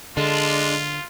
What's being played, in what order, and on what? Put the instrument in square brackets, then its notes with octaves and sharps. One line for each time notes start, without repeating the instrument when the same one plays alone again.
[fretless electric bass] D3 [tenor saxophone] G#3 [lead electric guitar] D4 [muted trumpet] F4